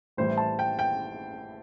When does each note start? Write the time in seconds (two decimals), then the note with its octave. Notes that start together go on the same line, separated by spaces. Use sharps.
0.17 A1 A2 E3 G3 C5
0.38 A5
0.59 G5
0.79 G5